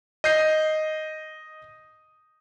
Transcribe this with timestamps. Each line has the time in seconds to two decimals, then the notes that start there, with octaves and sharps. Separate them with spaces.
0.24 D#5 D#6 G6 C7